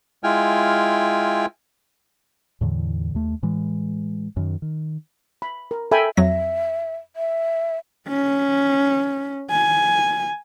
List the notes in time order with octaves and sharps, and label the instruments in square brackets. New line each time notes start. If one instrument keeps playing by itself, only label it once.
[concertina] G#3 E4 F4 G5 G#5 F6
[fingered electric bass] E2 A2 D3 E3
D#2 A3
A2 E3 G#3
F#2 D#3
D#3
[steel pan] B5
A#4
A4 E5 G5 G#5 B5
[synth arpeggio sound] F2 F#3 A#6 [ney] E5
[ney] E5
[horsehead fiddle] C#4
G#5